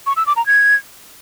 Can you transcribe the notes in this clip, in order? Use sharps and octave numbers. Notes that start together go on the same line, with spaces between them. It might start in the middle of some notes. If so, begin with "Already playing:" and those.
C#6
E6
D6
A#5
G#6